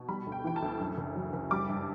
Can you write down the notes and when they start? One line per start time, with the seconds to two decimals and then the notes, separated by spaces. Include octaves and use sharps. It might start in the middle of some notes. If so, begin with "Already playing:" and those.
Already playing: B2
0.08 G3 B5
0.26 D2
0.32 G5
0.44 E3 G5
0.56 A5
0.62 D2
0.80 F#2
0.98 F#1
1.16 F#3
1.33 F#1
1.51 G3 D6
1.69 G2